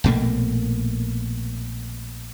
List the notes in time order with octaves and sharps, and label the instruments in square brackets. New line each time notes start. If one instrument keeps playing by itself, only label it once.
[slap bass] A#1 B2 A3 A#3